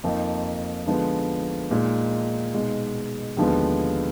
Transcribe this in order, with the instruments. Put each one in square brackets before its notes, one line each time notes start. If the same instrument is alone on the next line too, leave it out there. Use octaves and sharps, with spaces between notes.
[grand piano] F2 F3 A#3 D#4
D3 F3 G#3 B3
A#2 G#3 D#4
B2 G#3 D#4
D#2 D3 F3 G#3 B3